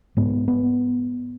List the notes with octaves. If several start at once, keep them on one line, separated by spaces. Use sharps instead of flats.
G#2 B3
B3